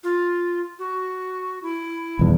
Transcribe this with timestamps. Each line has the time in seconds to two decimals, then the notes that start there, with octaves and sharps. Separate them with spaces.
0.04 F4
0.79 F#4
1.63 E4
2.19 D#1 E2